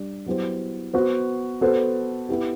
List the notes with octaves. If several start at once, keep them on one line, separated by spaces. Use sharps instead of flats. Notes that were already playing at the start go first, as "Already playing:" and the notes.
Already playing: G3 D4 G4 D5
F#3 B3 E4 G4 C5
B3 F#4 C5
B3 F#4 A4 C5
B3 E4 G4